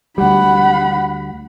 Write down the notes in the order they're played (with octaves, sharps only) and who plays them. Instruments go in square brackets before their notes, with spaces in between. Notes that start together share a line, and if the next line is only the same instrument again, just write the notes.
[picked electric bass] D2 G3 [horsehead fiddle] F#5 B5